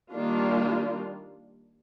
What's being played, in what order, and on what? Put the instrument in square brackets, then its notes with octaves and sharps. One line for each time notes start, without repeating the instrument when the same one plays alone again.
[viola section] D#3 G3 A#3 D4 F4